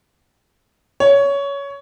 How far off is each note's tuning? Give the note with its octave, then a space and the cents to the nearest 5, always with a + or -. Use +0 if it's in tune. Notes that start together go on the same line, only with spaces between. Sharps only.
C#5 +15